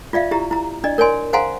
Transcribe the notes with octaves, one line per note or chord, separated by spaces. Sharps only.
F4 D5 E5 F5
E4 G4 A#5
E4 A#5
D4 D5 D#5
A#4 C#5 D5 G#5 C6
C5 F5 F#5 G#5 A#5 C6